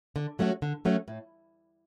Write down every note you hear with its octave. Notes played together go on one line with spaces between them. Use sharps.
D3
F#3 A3 C#4 F#4
D3
F#3 A3 C#4 F#4
A2